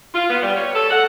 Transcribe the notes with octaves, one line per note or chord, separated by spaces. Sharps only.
F4
B3
G3
C#5
A4
F#5